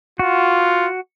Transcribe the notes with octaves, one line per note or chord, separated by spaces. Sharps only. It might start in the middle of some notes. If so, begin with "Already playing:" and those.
F4 F#4